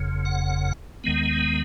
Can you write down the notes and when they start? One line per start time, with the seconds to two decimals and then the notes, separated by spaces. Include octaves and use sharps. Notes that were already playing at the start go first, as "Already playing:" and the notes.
Already playing: F#1 F2 C#3
0.25 F#5
1.04 D#2 D#3 G#3 B3